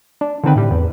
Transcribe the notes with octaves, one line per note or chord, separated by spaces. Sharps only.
D4
D3 D#3 C4 B4
A2 G3
E2